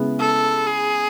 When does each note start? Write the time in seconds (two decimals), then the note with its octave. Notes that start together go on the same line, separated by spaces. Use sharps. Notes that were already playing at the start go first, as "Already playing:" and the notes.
Already playing: C#3 G#3 B3 E4
0.20 A4
0.66 G#4